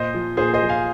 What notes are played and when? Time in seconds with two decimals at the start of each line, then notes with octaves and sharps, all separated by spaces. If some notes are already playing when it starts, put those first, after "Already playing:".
Already playing: A#2 C5 D#5
0.14 F3
0.37 A#2 G#4 C5
0.54 C5 D#5
0.62 F3
0.69 F5 G#5